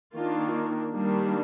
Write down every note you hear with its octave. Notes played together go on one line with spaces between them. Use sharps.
D#3 A#3 D4 F4
D#3 G3 A#3 D4